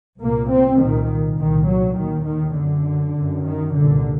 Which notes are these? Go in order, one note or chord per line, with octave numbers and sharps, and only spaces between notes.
C2 A#2 A#3
C4
C2 A#2 D#3
C2 A#2 D#3
F#3
D#2 D#3
D#3
F#2 D3
F#2
D#3
C2 A#2 D3